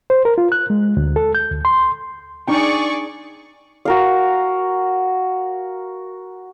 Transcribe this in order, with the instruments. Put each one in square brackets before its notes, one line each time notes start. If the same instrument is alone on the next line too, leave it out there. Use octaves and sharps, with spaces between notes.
[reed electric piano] C5
A#4
F4
F#6
G#3
D2
A4
G6
D2
C6
[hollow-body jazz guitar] D4 D#4 G5 [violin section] G#4 D5 C#6
[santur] F#4 A#4 F5